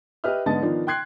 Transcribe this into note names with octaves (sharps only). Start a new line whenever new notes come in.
G4 B4 D#5 E5 F6
G#2 D3 B3 D#5 A5 A6
D#3 F3 B3 D4 D#4
G5 C6 F#6 G#6 C7